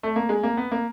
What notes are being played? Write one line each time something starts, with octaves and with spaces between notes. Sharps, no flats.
A3
A#3
G#3
A#3
B3
A#3